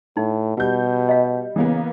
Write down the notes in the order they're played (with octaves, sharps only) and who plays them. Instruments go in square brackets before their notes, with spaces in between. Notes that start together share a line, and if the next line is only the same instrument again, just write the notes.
[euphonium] A2 [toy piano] D#4
[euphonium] B2 [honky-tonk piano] G3 G6
[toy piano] D#5 F5
[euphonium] C#3 [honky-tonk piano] E3 A#3 B3